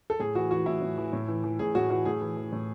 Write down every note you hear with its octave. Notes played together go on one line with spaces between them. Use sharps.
A4
A2 G#4
E3 F#4
E3 F#4
A2 E4
A2
E3
A2
E3
E3
A2 G#4
A2 F#4
E3 F#4
A2 G#4
E3
E3
A2